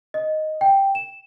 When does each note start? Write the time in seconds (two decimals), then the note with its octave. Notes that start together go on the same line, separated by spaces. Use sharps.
0.14 D#5
0.61 G5
0.95 E7